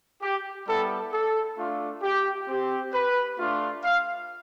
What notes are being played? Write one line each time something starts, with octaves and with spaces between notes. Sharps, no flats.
G4
G3 B3 E4 G4 A4
A4
A3 D4 F4
G4
C4 G4
B4
A3 D4 F4
F5